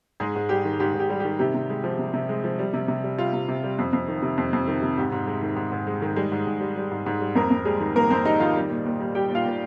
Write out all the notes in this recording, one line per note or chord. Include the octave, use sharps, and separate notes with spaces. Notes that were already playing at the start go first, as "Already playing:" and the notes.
G#2 G#3 G#4
G#2
G3 G4
D#3
G#2 G4
G#2
G4
G3
G4
D#3
C3 G4
C3
G#3
F3
C3
C3
G#3
F3
G3
C3
C3
G3
G3 F4
C3
C3
G3
F2
F2
D#3
C3
F2
F2
D#3
C3
G#2 G4
G#2
G#3
D#3
G#2
G#2
G#3
D#3
G3 G#3 G#4
G#2
G#2
G3
G3
G#2
G#2
G3
F2 A#3 A#4
F2
G3 G#3 G#4
D#3
F2 A#3 A#4
F2 C4 C5
G3 D#4 D#5
D#3 F4 F5
G3
A#2
A#2
G3
G3 G4 G5
A#2
F4 F5
A#2